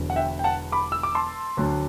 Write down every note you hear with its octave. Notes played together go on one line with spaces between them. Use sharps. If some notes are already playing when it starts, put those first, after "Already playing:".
Already playing: E1 E2 D3 F#3
F#5
E5 G5
G5
F#5 A5
B5 D6
E6
D6
A5 C6
D2 D3 F#3